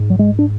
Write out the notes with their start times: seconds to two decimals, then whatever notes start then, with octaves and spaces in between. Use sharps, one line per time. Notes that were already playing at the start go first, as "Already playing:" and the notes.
Already playing: G#2
0.10 F#3
0.19 G#3
0.39 D4